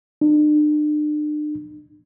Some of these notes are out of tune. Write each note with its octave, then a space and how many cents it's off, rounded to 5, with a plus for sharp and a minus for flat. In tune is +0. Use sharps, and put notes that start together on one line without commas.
D4 +40